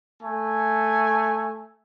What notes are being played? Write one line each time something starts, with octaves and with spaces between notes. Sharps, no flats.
A3 G#5